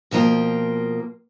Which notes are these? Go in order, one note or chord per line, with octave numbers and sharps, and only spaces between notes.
B2 F3 A#3 F4 G5